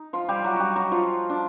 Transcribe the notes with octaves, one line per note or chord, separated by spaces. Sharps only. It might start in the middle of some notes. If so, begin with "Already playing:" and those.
Already playing: D#4
F3 F4
G3 G4
F#3 F#4
G3 F#4 G4
F#3 F#4
F3 F4
D4